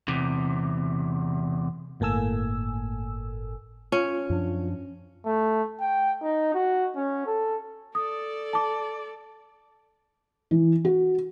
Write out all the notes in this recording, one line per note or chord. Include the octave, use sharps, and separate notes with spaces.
E2 C3
G1 A2 A#3 A4 G#5 E6
C#4 F4
F#2 F3 D4
A3
G5
D#4
F#4
C#4
A4
A4 D5 D#6
A5 D6
E3
F#4